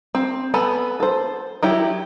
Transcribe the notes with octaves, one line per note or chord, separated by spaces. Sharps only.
C4
B3 A4 G#5 B5
A4 C5
F#3 E4 G4